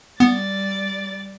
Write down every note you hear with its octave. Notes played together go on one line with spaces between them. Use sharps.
G3 B3 D5 A6